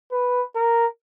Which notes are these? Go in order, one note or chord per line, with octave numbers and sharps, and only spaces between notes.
B4
A#4